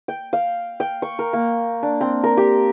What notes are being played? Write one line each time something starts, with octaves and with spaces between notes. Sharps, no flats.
G5
F5
G5
C#6
A#4
A#3
D4
C4
A#4
G4